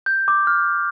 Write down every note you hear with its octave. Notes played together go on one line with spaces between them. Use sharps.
G6
D6
F6